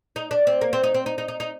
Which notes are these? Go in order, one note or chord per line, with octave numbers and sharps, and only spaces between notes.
D#4
D4
C4
A#3
C4
D#4
C4
D#4
D#4
D#4
D#4